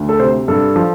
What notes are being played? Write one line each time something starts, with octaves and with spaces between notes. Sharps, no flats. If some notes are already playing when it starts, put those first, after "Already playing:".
Already playing: D2
A4
C3 C5
G2 A4
F3